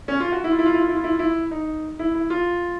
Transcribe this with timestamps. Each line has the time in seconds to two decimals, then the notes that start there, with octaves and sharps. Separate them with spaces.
0.08 C#4
0.20 F4
0.32 F#4
0.44 E4
0.51 F4
0.59 E4
0.66 F4
0.74 E4
0.81 F4
0.89 E4
0.96 F4
1.04 E4
1.12 F4
1.19 E4
1.51 D#4
1.99 E4
2.15 E4
2.30 F4